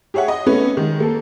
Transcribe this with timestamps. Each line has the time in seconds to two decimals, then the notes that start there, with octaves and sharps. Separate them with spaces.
0.14 G4 G#4 C#5 E5 F#5
0.28 D#5
0.46 A3 B3 C#4 B4
0.77 D#3 G#3
1.00 A#3 A4